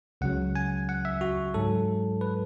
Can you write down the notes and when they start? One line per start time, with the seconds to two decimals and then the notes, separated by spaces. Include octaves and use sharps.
0.21 C#2 C#3 F#3 F#5
0.56 G#5
0.89 F#5
1.05 E5
1.21 F#4
1.54 G#2 F#3 A4
2.21 B4